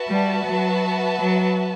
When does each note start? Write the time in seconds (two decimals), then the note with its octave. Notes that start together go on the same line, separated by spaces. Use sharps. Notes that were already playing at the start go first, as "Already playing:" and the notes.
Already playing: F#4 B4 E5 A5
0.08 G3
0.45 F#3
1.19 F#3